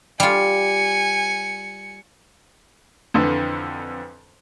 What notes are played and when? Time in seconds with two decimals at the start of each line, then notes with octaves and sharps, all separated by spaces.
0.20 G3 F4 G#5 C#7
3.14 F2 D3 E3